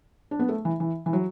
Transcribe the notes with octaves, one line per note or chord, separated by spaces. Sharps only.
D4
B3
A3
E3
E3
E3
F#3